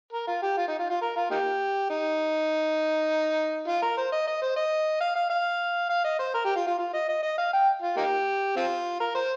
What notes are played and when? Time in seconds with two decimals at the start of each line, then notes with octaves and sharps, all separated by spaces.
0.13 A#4
0.27 F4
0.42 G4
0.57 F4
0.68 D#4
0.79 F4
0.90 F4
1.02 A#4
1.16 F4
1.31 A#3 D#4 G4
1.90 D#4
3.68 F4
3.82 A#4
3.97 C5
4.12 D#5
4.27 D#5
4.42 C5
4.56 D#5
5.01 F5
5.15 F5
5.30 F5
5.90 F5
6.04 D#5
6.19 C5
6.34 A#4
6.45 G4
6.56 F4
6.67 F4
6.78 F4
6.93 D#5
7.09 D#5
7.23 D#5
7.38 F5
7.53 G5
7.82 F4
7.97 A#3 D#4 G4
8.56 C4 F4
9.00 A#4
9.15 C5